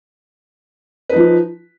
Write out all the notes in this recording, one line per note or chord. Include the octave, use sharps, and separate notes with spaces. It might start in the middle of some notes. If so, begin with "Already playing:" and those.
F3 D#4 B4